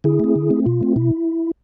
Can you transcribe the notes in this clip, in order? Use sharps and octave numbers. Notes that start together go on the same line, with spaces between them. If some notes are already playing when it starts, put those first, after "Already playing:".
D3 E4 G#4
A3 C4
D3
A3 C4
B2 F4
A3 C4
B2 E4